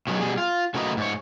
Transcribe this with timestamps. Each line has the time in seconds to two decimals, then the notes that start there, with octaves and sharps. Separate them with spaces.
0.07 B2 D#3 F#3 G#3
0.20 B2 G3 G#4
0.38 F4
0.74 C#3 A3 F#4 A#4 B4 D#5
0.97 G#2 C#5